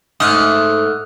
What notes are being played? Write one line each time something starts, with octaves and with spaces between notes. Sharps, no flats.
G#2 A3 D#6 F6 F#6